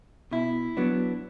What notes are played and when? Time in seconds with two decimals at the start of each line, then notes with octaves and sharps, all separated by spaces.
0.31 B2 E4
0.77 F#3 B3 D4